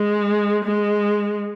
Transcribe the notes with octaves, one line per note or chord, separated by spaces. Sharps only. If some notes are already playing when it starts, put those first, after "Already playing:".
Already playing: G#3
G#3